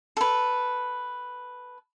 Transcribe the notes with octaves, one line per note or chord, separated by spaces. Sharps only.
A4 B4